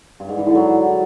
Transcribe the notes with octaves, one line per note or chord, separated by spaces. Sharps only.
G2
G#2
E3
D3
F#3